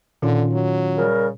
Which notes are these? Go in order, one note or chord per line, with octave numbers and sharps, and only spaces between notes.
A#2 D3 D#3 C#4 F4
F#3
C#3 G3 A#4